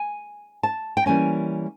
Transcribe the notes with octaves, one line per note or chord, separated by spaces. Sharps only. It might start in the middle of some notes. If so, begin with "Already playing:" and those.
Already playing: G#5
A5
G5
E3 G3 A#3 C#4 G#5